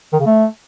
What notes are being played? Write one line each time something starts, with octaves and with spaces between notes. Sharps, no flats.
D#3
C#3
A3